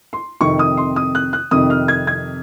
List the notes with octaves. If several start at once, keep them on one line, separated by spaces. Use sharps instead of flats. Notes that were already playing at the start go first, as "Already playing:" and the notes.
C6
F2 C3 D#3 C#6
D#6
C6
D#6
F#6
F#6
F2 C3 D#3 D#6
F6
G#6
G#6